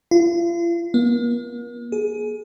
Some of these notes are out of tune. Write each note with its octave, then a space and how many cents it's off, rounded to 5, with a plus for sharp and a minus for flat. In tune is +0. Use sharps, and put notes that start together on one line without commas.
F4 -40
A#3 +40
G#4 +20